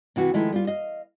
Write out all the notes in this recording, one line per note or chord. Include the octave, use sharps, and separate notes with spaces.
C3 E3 F#4
D#3 F3 G#3 A3 D#4 E4
G3 F4
D#5 F5